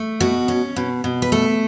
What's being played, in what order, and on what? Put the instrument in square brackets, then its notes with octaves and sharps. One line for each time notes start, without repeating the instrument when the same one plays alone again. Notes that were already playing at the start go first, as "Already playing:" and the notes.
Already playing: [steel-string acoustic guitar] A3
B2 F#4
C#4
B2
B2
B4
A3 A4